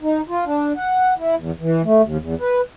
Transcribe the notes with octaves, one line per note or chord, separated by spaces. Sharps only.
D#4
F4
D4
F#5
E4
E2
E3
A3
D#2
E2
B4